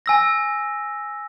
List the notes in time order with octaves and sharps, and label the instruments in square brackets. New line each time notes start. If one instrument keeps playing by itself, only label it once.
[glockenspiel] G#5 E6 A#6